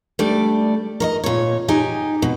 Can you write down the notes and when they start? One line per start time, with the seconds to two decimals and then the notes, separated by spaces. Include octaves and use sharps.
0.19 G3 A3 D4 D5
1.00 A#4 C#5 D#5
1.24 A#2 C#5
1.68 D#4 G4 G#5
2.22 B2